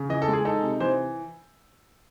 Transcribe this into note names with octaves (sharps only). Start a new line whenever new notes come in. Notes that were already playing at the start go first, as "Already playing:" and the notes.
Already playing: C#3
E3 D#5
A4
G#3
G#4
D#4 A4
C3
E3 C5